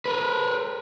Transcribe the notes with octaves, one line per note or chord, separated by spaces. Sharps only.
A#4 B4